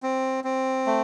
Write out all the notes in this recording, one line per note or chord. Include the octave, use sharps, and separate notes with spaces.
C4
C4
A3